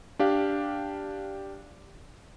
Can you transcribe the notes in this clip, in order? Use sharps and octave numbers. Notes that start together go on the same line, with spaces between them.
D4 G4 F5